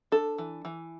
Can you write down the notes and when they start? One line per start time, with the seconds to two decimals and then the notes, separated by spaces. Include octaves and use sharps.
0.12 D4 A4
0.38 E3
0.65 E3